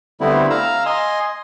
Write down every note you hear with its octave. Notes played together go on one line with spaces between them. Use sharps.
D3 G3 A3 B3 C4 E4
F5 A#5 E6
D#5 G#5 C6